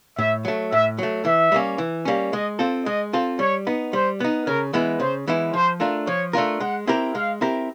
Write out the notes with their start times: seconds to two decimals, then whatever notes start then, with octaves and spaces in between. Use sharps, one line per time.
0.18 A2 E5
0.45 F#3 A3
0.72 A2 E5
0.99 F#3 A3
1.25 E3 E5
1.52 G3 A#3 C#4
1.78 E3
2.05 G3 A#3 C#4
2.33 G#3 D#5
2.59 C4 F4 A4
2.86 G#3 D#5
3.13 C4 F4 A4
3.39 G3 C#5
3.67 B3 D#4
3.93 G3 C5
4.20 B3 D#4
4.46 C#3 A#4
4.73 E3 G#3 B3 E4
5.00 C#3 C5
5.28 E3 G#3 B3 E4
5.54 F3 C5
5.80 A3 D4 F4 A#4
6.07 F3 C#5
6.33 A3 D4 F4 A#4
6.60 G#3 F#5
6.87 C4 E4 G4 A#4
7.15 G#3 F5
7.41 C4 E4 G4 A#4